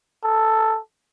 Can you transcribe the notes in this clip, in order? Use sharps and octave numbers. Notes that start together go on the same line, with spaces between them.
A4